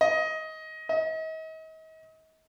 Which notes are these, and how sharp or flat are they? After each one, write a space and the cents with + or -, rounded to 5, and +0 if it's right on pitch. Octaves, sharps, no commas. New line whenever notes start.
D#5 +20
D#5 +40